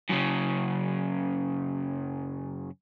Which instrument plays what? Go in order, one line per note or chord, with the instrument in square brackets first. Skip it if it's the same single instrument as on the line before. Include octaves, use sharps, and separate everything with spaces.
[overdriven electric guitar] F#2 C#3